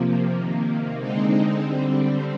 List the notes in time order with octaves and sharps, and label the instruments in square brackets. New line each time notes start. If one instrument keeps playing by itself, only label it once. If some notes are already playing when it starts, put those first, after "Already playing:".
Already playing: [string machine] C3 F3 A#3
C3 D#3 A#3
D3 G#3 C4 D#4
D3 G3 C4